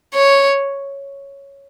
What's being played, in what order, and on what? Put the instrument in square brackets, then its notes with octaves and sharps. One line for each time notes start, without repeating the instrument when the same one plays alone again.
[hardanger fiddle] C#5